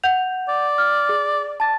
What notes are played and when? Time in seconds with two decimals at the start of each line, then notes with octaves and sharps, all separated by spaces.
0.04 F#5 G6 F7
0.48 D5
0.78 F6
1.09 G#4
1.60 A5 A6